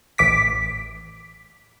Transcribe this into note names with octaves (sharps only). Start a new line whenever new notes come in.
A1 D6 B6